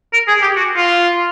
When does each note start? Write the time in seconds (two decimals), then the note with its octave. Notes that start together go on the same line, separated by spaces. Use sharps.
0.13 A#4
0.27 G#4
0.42 G4
0.56 F#4
0.76 F4